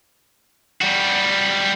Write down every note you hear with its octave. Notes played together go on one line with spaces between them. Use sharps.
G3 F#4